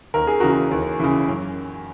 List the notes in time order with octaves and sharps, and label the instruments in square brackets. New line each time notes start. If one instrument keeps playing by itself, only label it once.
[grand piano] D#2 A#4
G#4
C#3 E3 F#4 A#4
D#2
C#3 E3
F#2